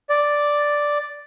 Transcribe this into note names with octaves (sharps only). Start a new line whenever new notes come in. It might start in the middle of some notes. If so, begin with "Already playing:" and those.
D5